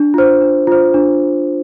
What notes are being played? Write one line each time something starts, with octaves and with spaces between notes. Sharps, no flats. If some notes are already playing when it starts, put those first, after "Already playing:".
Already playing: D4
F4 C5
D4
F4 C5
D4